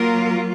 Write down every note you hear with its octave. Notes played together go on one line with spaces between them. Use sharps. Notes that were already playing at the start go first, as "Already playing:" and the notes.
Already playing: F#3 A#3 F4 A#4